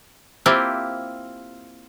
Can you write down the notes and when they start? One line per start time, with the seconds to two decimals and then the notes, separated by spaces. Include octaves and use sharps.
0.46 A#3 C4 E4 F4 G4